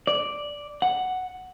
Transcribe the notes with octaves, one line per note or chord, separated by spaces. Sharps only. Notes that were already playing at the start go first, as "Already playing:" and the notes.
D5
F#5